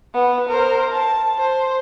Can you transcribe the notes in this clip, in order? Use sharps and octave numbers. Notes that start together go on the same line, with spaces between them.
B3
A#4 C5
A5
C5